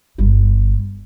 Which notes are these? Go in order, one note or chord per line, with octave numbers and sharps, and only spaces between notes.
G1 G3